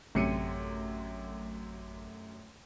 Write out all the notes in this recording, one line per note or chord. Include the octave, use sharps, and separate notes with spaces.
A1 F#2 C3 A3 C6 G#6 C#7 D#7